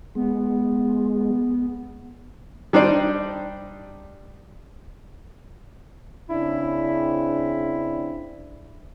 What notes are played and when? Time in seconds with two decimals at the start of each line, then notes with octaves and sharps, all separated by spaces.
0.15 G#3 B3
2.73 G3 D4 D#4 C5 D5
6.30 C#3 C4 D4 E4